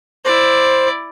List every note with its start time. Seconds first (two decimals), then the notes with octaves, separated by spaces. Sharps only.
0.25 E4 C5 D5